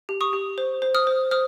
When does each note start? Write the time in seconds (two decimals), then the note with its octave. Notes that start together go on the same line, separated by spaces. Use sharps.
0.09 G4
0.21 C#6 D#6
0.33 G4
0.58 C5
0.82 C5
0.94 D#6 F6
1.07 C5
1.31 C5 D#6 F6